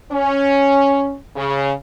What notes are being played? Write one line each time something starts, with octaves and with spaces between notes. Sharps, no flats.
C#4
C#3